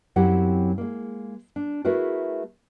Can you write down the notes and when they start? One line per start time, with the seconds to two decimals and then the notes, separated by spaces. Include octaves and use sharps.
0.16 F#2 F#3 C4 E4 G4 F#5
0.78 G#3 A#3
1.56 D4
1.85 A3 E4 F#4 G#4 A#4 B4